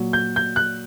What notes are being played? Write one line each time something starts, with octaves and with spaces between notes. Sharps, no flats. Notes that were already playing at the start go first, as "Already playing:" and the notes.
Already playing: A#2 F#3
G6
G6
F#6